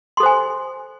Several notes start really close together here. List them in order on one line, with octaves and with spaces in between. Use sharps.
C6 A4 C5 G#5